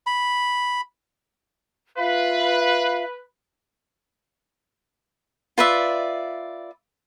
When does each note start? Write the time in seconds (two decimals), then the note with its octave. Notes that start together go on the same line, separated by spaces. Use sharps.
0.07 B5
1.97 F4 B4 E5 F5
5.58 F4 B4 D5 E5